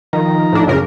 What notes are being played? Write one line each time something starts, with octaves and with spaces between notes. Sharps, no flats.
D#3 F3 D#4 A#5
A2 D4
F#2 C#3 A#4